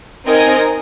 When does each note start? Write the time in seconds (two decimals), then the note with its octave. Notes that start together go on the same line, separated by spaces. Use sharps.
0.26 C4 D#4 A#4 D#5 G#5